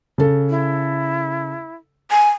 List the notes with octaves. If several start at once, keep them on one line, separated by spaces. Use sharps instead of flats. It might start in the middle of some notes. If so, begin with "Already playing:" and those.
C#3 A4
E4
G#5